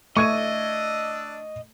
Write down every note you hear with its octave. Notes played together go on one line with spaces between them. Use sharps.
A3 D4 D#5 C#6 E6 G#6 D#7